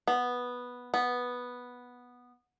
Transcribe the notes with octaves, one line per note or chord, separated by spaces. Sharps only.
B3
B3